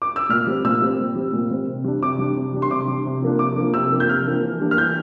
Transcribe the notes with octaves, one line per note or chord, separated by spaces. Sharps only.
D6
E6
A#2 F6
G3 C4
A#2 E6
G3 C4
A#2
G3 C4
A#2
G3 C4
C3
G3 D4
C3 D6
G3 D4
C3
G3 D4
C6
C3 D6
G3 D4
C3
F3 A#3 D4
C3 D6
F3 A#3 D4
C3 E6
F3 A#3 D4
G6
C3 F6
F3 A#3 D4
E3
G3 A#3 D4
F6
E3 G6